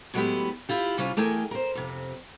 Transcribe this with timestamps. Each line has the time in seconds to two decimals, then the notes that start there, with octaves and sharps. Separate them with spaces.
0.14 A2 F#3 G#3 B3 E4 G4
0.69 E4 F4 G4
0.97 C3 G3 C#4 F4
1.17 E3 A3 G#4 A#4 G5 G#5
1.51 A#4 C5
1.75 F2 C3